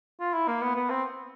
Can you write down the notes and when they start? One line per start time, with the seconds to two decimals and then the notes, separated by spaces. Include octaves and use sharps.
0.20 F4
0.34 E4
0.48 A#3
0.62 B3
0.76 B3
0.90 C4